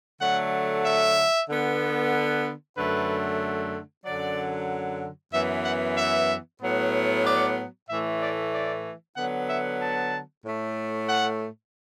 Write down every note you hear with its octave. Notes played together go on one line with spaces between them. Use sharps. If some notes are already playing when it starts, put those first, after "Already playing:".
D3 F#3 A3 F#5
E5
D3 B3
F#2 D3 A3 B4
F#2 D3 F#3 D5
F#2 E3 B3 E5
F#5
E5
A2 F#3 B3
D5
A2 E3 A3 E5
D5
D5
D3 F#3 B3 F#5
E5
A5
A2 A3
F#5